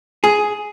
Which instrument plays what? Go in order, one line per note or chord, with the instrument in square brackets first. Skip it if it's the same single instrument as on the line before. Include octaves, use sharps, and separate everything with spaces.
[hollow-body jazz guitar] G#4